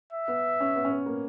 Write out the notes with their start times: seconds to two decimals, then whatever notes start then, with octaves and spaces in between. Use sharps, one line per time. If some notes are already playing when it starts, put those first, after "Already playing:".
0.12 E5
0.28 B3
0.60 C#4
0.76 B3
0.85 C#4
0.91 B3
1.06 A#3